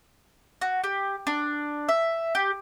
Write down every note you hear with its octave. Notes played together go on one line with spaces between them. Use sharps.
F#4
G4
D4
E5
G4